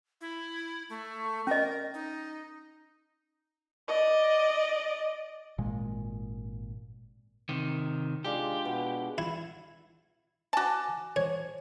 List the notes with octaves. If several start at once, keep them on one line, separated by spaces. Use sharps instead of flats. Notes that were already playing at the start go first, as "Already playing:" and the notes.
E4
A3
C#4 A#4 D#5
D#4
D5 D#5
G#1 A#2 G#3
C3 D#3
G#3 D4 F4 G4
B2
E4
F#4 G#5 A5 D6
C5 C#5